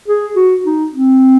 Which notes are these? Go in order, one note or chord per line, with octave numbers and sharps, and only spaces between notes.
G#4
F#4
D#4
C4